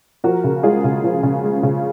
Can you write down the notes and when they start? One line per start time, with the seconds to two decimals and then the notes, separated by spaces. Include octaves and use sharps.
0.24 F3 F#4 A#4
0.44 C#3
0.63 G#3 F4 G#4
0.84 C#3
1.04 F3
1.23 C#3
1.44 G#3
1.63 C#3